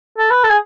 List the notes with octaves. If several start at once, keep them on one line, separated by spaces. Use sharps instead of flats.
A4
B4
A4
G#4